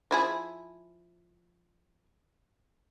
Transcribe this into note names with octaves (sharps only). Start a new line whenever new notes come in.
F3 E4 G#4